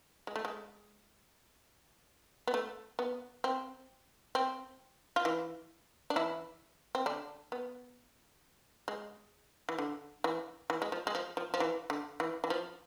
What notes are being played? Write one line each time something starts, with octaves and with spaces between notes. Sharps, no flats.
G#3
A3
G#3
B3
A3
B3
C4
C4
F4
E3 E4
D4
E3 E4
C4
D3 D4
B3
G#3
E3
D3
E3
E3
G#3
F3
G#3
F3
F3
F3
E3
D3
E3
E3
F3